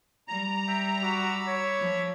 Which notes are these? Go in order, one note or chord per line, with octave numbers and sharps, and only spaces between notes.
G3 A#5
E5 G5
F#4 B5 D6 E6
C#5
F3